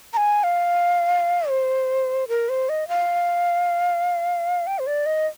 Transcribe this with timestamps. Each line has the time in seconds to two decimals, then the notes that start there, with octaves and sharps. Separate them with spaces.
0.13 A#5
0.17 G#5
0.44 F5
1.49 C5
2.28 A#4
2.49 C5
2.69 D#5
2.89 F5
4.67 G5
4.79 C5
4.87 D5
5.06 D#5